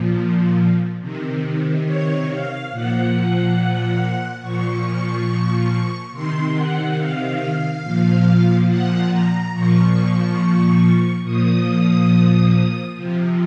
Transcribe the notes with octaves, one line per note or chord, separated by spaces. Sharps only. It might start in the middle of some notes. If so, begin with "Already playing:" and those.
Already playing: A#2 F3
C3 D#3
C#5
F5
A#2 F3 F#5
A#2 F3 C#6
C3 D#3 C6
F#5
F5
A#2 F3
F#5
A#5
A#2 F3 C#6
A#2 F3 D#6
C3 F3